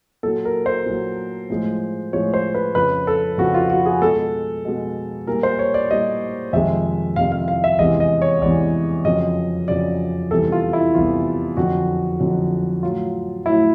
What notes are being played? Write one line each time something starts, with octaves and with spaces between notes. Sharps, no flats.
A#2 F#3 A4
A#4
C5
A#2 F#3
A2 F3 G#3
A2 F3 G#3 C#5
C5
B4
F2 C#3 F3 B4
A4
F2 C#3 F3 F#4
F4
F#4
G#4
B2 G#3 A4
B2 G#3
A#2 G3 A#4
C5
C#5
D5
A#2 G3 D#5
F2 C3 D#3 G#3 E5
F2 C3 D#3 G#3 F5
F5
F5
E5
E2 C3 E3 G#3 D#5
D#5
C#5
E2 C3 E3 G#3 D5
F2 C#3 F#3 D#5
F2 C#3 F#3 D5
E2 C3 E3 G3 A4
F4
E4
E2 C3 E3 G3 F4
F2 D3 F#3 F#4
F2 D3 F#3
A2 F#3 F4
A2 F#3 E4